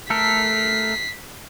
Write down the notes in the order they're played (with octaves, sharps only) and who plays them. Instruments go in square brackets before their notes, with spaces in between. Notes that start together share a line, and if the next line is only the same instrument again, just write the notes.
[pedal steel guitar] A3 A4 A#4 [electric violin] B6 C7